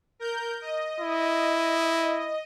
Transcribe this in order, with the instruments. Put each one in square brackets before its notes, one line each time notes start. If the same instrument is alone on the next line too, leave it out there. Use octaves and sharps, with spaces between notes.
[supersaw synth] A#4 G6
D#5
[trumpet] E4